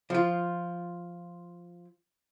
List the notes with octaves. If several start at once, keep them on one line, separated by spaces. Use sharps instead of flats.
F3 F4